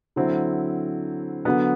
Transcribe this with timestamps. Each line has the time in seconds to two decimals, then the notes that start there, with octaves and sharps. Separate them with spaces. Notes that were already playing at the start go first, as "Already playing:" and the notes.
0.16 D3 F#3 C4 E4
1.45 D3 F#3 B3